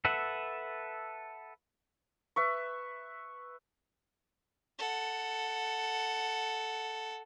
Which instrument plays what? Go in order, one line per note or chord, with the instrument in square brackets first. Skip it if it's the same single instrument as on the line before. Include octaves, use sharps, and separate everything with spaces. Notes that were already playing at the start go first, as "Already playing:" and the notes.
[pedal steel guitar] A4 B4 E5 F#5
[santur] B4 E5 C#6
[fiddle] A4 F#5